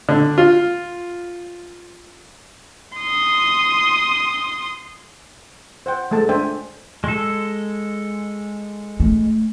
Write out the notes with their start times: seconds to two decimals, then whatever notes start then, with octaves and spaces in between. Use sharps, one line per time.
0.09 D3
0.38 F4
2.98 C6 D#6
5.86 C5 F#5 G5
6.11 G#3 A3 A4 A5
6.29 D4 C5 E5 G5 G#5
7.04 G#3 A4
9.00 A3